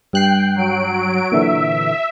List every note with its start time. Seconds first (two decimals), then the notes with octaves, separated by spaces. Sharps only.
0.13 G2 G5 F#6 C7
0.55 F#3 D7
1.32 A#2 D3 E3 E5